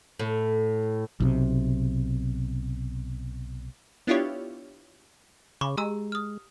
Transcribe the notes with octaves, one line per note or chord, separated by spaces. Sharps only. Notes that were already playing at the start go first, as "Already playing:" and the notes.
A2
B1 C3
B3 D4 E4 F4 G4 C#5
C#3 B5 C#6 D6
G#3 G4 A#5 E6
D#6 F6